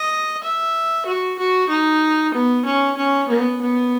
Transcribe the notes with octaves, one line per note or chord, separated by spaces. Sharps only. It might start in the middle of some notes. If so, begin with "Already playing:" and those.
Already playing: D#5
E5
F#4
F#4
D#4
B3
C#4
C#4
B3
B3